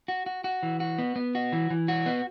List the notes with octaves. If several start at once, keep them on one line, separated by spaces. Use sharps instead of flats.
F#4
F#4
F#4
E3
F#4
B3
B3
F#4
E3
E3
F#4
B3